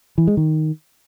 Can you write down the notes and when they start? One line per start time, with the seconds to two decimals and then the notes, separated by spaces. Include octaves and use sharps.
0.18 E3
0.27 G#3
0.37 D#3